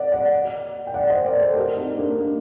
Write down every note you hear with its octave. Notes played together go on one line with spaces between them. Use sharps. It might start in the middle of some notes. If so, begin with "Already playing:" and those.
Already playing: D5 D#5 F#5
D5 F#5
G5
D5 F#5
C5 D#5
A#4 D5
A4 C5
G4 A#4
C4 D#4
A#3 D4
A#3